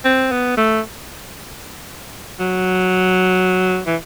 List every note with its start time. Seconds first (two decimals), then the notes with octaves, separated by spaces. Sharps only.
0.05 C4
0.32 B3
0.57 A3
2.40 F#3
3.86 E3